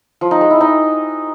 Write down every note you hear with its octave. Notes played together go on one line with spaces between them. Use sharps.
F3
D#4
G#3
E4
D#4